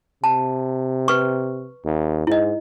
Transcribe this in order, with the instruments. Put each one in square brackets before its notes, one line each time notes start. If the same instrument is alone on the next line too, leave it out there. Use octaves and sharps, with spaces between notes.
[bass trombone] C3 [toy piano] A5
[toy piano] B4 C#6
[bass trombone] D#2
[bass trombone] G#2 [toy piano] E4 D#5